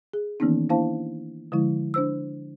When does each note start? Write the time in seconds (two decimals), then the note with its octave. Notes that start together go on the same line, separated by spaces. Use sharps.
0.13 G#4
0.40 D#3 E3 A#3 B3 C#4 D#4
0.69 A#3 D4 E4 C5 F5 A5
1.52 D3 F3 G#3 E4
1.94 D4 C5 E6